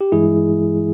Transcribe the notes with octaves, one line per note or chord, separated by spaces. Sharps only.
G4
G2 E3 G#3 E4 G#4